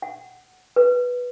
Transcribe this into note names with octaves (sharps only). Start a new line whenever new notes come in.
F#5
B4